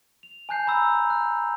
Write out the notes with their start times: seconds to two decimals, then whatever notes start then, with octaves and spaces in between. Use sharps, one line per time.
0.23 F7
0.49 G#5 A5 F#6 G6 C7
0.67 A#5 B5 E6
1.10 F#6